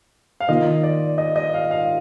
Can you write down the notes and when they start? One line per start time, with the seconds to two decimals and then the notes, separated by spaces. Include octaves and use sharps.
0.40 F5
0.48 D#3 A#3 F4 D#5
0.83 D5
1.18 D#5
1.36 D#5
1.54 F5
1.71 F5